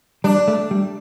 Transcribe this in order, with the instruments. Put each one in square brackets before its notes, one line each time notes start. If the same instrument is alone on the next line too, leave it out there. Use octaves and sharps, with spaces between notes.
[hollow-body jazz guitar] G3 [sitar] D4
[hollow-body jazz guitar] A3
G3